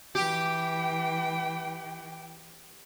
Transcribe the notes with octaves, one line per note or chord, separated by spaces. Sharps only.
E3 G4 G5